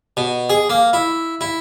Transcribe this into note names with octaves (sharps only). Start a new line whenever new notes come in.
B2
G#4
A#3
E4
E4